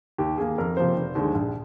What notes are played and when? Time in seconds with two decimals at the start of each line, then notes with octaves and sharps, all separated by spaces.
0.18 D#2 G4
0.38 D#3 A#3 G#4
0.58 F2 A#4
0.77 C3 F3 A#3 C5
0.97 F1
1.15 D#2 D3 G#3
1.35 A#1